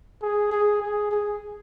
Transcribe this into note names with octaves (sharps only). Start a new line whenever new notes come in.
G#4
G#4
G#4
G#4